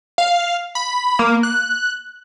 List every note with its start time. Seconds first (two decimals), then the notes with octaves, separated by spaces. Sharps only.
0.18 F5
0.75 B5
1.19 A#3
1.43 F#6